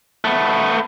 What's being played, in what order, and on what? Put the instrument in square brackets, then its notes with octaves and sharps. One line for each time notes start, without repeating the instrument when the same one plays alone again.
[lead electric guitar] A3 B3